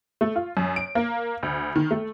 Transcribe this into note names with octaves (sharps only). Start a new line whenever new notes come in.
A3
F4
F#2
D7
A#3
D2
D#3
A3